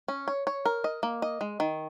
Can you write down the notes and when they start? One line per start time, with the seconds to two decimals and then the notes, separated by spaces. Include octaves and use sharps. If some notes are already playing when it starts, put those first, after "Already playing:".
0.08 C#4
0.28 C#5
0.47 C#5
0.65 A#4
0.84 D#5
1.03 A#3
1.22 D#5
1.41 G#3
1.60 D#3